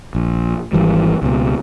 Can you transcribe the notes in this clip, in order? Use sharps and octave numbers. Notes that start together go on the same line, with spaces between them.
A#1
G#1 E3 G3
C#2 B2